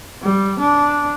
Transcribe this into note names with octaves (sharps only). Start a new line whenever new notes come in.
G3
D4